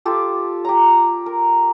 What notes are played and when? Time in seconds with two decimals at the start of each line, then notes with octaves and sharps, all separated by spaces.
0.05 F4 G4 A4
0.65 G4 A#5
1.26 A#4